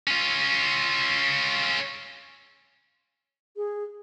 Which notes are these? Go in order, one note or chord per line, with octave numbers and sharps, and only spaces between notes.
C#4 F4
G#4